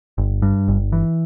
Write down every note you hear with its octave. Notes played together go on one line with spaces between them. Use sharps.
G1
G2
G1
E3